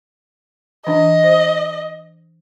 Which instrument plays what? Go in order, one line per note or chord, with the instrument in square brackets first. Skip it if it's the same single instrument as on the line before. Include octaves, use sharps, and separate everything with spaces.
[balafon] E3 D4 [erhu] D#5
[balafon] C5